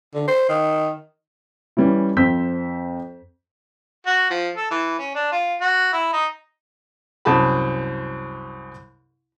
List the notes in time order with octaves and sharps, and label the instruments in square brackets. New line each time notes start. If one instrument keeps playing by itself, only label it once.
[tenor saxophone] D3
C5
D#3
[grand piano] E3 G3 C#4 E4
F2 C4 E6 G6 B6
[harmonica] F#4
F3
A4
E3
C#4
D4
F4
F#4
E4
D#4
[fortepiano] C2 F#2 G#4 A5 B5